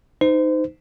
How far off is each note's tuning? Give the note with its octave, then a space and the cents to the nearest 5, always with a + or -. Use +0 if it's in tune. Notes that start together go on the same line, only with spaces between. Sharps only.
D#4 +0 C5 -30